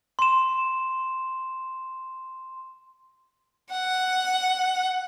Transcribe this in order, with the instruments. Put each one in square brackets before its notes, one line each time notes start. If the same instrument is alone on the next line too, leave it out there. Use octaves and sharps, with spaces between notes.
[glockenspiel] C6 E7
[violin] F#5